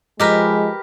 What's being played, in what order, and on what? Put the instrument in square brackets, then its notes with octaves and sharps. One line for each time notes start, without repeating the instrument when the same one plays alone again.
[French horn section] F3 G#3 [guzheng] G4 A#4 B4 [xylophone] D#5 D6 F6